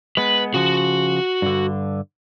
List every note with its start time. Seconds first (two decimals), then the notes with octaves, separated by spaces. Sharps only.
0.17 G#3 B3 B4
0.54 C#3 F3 F#4
1.42 G2 D3